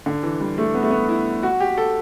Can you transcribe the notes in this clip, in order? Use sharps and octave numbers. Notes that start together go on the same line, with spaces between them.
D3
E3
G3
A3
B3
A3
B3
E4
F#4
G4
A4